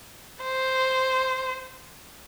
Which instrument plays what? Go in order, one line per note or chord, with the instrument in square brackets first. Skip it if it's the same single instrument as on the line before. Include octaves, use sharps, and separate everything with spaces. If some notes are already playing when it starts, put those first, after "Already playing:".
[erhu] C5